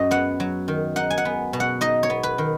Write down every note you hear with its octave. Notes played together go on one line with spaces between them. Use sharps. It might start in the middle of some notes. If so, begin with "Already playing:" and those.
Already playing: F#2 F#3 D#5
B3 F#5
F#3
D#3
D#4 F#5
G#5
F#5
B3
B2
F#5
D#4 D#5
C#5
B3
B4
D#3